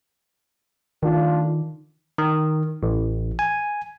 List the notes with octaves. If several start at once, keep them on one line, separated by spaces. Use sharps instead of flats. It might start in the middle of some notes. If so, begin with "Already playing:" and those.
D#3 A3 D4 F4
D#3
A1
G#5